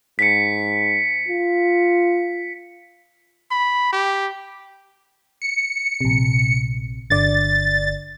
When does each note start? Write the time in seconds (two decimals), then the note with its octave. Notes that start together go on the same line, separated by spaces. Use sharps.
0.19 G#2 B6 C#7
1.28 F4
3.51 B5
3.93 G4
5.42 C#7
6.01 A#1 C3
7.10 G1 D3 D5 A6